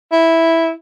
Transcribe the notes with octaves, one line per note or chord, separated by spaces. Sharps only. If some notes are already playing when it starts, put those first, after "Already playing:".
E4